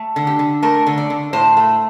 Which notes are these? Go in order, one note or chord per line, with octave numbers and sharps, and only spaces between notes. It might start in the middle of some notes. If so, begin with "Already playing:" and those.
Already playing: A3
D3
G4
D3
A3 A#4
D3
D5
D3
A2 C5
A3